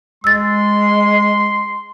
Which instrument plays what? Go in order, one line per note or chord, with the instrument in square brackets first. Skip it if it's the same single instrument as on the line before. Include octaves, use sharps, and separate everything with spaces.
[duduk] G#3 [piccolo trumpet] C6 [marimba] E6 A6